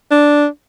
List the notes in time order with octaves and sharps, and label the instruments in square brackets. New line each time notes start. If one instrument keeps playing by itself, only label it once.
[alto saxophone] D4